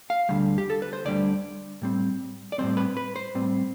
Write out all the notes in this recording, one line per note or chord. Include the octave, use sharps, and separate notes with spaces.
F5
D2 D3 G3
G4
A4
B4
C5
D2 D3 G3 D5
A2 G3 C4
D5
A2 G3 C4 C5
B4
B4
C5
A2 G3 C4